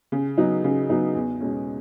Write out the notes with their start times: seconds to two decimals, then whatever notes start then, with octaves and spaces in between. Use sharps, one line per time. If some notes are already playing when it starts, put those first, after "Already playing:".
0.12 C#3
0.38 F#3 B3 D#4
0.64 C#3
0.90 F#3 B3 D#4
1.15 E2
1.41 B2 G#3 C#4